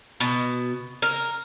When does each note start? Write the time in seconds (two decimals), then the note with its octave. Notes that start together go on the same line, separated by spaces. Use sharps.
0.20 B2
1.02 A#4